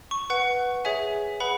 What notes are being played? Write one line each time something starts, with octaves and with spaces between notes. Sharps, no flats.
C#6
B4 F#5
G#4 C#5 E5 G#5
G#4 B4 F#5 B5